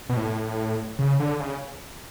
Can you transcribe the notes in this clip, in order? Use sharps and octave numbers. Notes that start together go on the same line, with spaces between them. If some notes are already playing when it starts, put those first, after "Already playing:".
B2
A2
C#3
D3
C#3